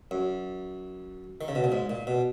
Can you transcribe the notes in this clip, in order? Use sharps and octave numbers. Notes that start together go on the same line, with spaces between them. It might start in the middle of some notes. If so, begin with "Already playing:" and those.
F#2
D#3
C#3
B2
A#2
G#2
A#2
B2